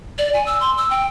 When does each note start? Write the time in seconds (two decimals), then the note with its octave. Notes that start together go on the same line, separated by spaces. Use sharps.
0.18 D5
0.33 G#5
0.46 E6
0.61 C6
0.78 E6
0.90 G5